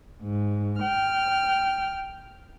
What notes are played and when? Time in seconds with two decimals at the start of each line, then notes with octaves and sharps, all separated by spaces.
0.22 G#2
0.80 G5 F6